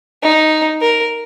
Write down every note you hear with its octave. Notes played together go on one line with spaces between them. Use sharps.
D#4
A#4